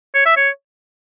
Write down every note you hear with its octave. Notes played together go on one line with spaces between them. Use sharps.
C#5
E5
C#5